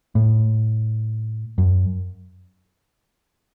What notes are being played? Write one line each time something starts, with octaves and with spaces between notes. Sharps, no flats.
A2
F#2